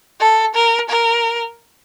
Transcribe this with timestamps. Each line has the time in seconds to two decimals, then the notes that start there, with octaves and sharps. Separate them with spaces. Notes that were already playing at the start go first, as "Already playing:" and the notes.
0.20 A4
0.55 A#4
0.89 A#4